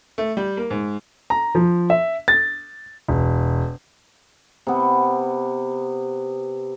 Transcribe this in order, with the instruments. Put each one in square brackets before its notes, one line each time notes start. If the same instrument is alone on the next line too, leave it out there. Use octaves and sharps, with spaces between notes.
[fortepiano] A3
G3
A#3
G#2
[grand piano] A#5
F3
E5
A6
E1
[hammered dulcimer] C3 B3